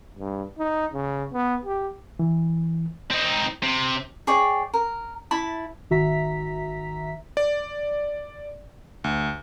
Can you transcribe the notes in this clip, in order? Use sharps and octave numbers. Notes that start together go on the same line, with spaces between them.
G2
D#4
C#3
B3
G4
E3
C4 D#4
C3
G#4 C#5 D5 G5
A#4
E4 A5 B5
G#1 D#3 F#4 E5 A#5 B6
D5
D2